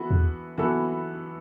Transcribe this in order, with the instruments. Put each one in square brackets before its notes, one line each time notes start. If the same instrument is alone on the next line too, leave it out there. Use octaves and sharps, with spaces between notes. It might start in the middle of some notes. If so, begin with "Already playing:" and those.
Already playing: [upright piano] E3 B3 F#4 A4
[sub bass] E2
[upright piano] E3 B3 F#4 A4